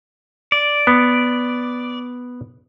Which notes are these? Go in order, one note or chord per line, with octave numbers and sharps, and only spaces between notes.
D5
B3